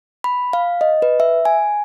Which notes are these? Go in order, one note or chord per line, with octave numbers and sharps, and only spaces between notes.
B5
F5
D#5
B4
E5
G#5